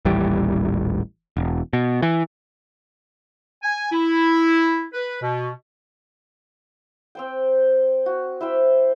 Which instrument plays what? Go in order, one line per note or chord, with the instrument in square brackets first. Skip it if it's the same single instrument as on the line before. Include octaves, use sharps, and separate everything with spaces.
[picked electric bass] D#1 A1 E3 G3
E1
B2
E3
[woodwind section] G#5
E4
B4
B2
[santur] C4 C5 G5
F#4
E4 C5 E5 G5